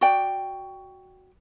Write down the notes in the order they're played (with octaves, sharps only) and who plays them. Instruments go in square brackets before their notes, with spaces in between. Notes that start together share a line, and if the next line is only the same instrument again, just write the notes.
[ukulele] F#4 D5 G5